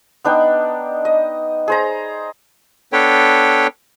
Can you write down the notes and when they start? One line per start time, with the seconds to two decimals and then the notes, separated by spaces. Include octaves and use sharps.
0.24 B3 D4 D#4 G5
1.05 D#5
1.68 G#4 C5 A#5
2.93 B3 D4 A4 B4 C#5 G5